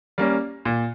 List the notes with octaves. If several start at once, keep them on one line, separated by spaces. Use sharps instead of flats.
G3 A#3 C#4
A#2